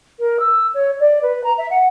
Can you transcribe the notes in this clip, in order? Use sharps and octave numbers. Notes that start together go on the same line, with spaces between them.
A#4
E6
C#5
D5
B4
A#5
E5
F#5